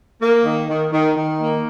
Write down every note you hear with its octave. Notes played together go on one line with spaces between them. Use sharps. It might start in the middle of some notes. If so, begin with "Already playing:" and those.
A#3
D#3
D#3
D#3
D#3
A#3